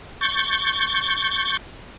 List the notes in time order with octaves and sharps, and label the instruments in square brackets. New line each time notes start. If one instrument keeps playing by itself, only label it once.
[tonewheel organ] C#6 G6 A6